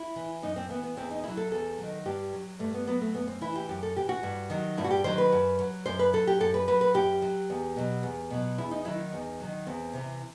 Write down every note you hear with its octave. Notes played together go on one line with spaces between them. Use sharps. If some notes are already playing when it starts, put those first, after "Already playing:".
Already playing: E4
E3
F#2 D#4
C4
E3 B3
B3
E2 C4
D#4
D#3 F#3 E4
A4
E2 A4
D#3 F#3
G2 G4
F#3
G2 A3
B3
F#3 B3
A3
F#2 B3
C4
E3 E4
G4
F#2 G4
A4
E3 G4
F#4
G2
D#3 F#3
G2 E4
F#4
G4
D#3 F#3 C5
B4
F#2
F#3
F#2 C5
B4
F#3 A4
G4
F#2 A4
B4
F#3 B4
B4
F#2 G4
F#3
E2
B2 F#3
E2
B2 F#3
E2 E4
D#4
D#3 F#3 E4
D#4
E2
D#3 F#3
E2 C4
C3 E3